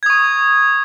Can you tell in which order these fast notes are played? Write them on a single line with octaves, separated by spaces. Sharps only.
G#6 D#6 C#6